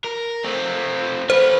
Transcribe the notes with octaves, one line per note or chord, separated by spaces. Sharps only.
A#4
A3 C4
A3 B4 C5